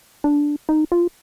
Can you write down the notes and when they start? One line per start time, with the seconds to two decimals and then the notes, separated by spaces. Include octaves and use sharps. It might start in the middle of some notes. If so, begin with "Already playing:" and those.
0.24 D4
0.69 D#4
0.92 F4